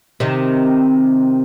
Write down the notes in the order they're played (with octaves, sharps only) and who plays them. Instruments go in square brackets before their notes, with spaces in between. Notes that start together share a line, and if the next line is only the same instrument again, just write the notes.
[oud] C3 D#3